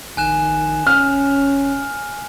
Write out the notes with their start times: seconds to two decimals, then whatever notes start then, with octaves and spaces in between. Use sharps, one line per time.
0.17 A#1 D#3 G#5 F#6 E7
0.87 E1 C#4 F6